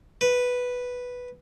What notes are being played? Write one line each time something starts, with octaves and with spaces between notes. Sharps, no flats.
B4